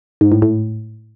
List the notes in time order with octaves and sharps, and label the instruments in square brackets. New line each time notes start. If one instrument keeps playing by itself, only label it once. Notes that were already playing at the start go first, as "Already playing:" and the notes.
[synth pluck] G#2
A2
A2